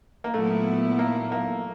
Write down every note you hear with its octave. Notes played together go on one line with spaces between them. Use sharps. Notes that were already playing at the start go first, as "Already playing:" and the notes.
A#3
A#2 F#3 A3 B3 E4
A#3
A#3